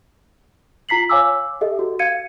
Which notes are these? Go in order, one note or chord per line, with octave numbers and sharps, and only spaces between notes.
F4 A#5 B6 C7 F#7
C#5 F5 G#5 D6 E6
G4 A4 D#5 E5
F#4
F5 G#6 C#7 D#7